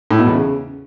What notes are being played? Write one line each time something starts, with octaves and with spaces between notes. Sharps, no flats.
A2
B2
E2
C#3